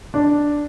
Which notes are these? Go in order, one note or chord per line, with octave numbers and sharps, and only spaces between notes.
D4